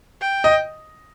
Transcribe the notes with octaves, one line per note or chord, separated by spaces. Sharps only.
G5
D#5